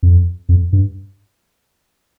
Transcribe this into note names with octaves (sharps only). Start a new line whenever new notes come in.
F2
F2
G2